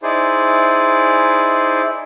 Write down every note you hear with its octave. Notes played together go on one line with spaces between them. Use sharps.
D#4 E4 G#4 C5 D5